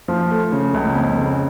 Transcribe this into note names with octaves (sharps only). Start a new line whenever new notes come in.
F3
A3
C#3
C#2
F2
C#3